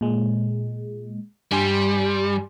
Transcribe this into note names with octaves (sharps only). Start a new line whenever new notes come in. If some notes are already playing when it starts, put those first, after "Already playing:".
A#2 G#3
G2 G3 G#5 C6